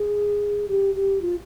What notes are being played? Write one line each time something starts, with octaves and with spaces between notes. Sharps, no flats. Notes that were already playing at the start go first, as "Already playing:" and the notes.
Already playing: G#4
G4
G4
F4